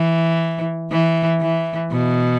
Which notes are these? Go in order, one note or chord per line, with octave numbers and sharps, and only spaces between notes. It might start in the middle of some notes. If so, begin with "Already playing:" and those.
Already playing: E3
E3
E3
B2